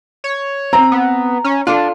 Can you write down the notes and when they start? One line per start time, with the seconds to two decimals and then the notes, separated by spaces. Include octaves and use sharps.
0.24 C#5
0.73 C4 A#5
0.92 B3
1.44 C#4
1.67 D4 F4 A4